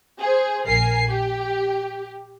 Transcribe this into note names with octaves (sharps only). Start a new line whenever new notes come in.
G#4 C5
A#1 A#4 G#5 C7
G4